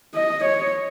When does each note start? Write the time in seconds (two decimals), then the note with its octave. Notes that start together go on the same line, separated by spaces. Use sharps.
0.15 D#5
0.45 C#5